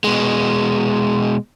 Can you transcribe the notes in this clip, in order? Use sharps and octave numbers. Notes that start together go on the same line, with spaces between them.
B2 G#3